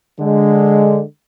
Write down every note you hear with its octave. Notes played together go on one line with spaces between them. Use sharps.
D3 G#3